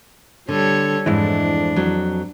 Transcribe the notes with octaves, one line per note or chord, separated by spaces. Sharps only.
D3 G3 A4 C#5
F2 G#2 E3 G#3 D4 E4
F2 F#3